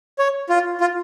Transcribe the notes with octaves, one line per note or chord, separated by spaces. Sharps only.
C#5
F4
F4